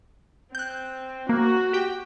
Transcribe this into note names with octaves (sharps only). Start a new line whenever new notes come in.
C4 F#6 G6
A#3 F#4
G4 G5